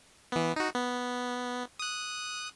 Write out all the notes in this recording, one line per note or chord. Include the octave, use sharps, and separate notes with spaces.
E3 B3
D#4 F#4
B3
D#6 F#6